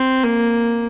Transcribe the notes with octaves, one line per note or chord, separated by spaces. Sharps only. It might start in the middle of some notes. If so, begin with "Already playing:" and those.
Already playing: C4
A#3